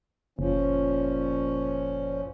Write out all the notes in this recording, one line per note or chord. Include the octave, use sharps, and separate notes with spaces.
F#1 A#2 F3 C#4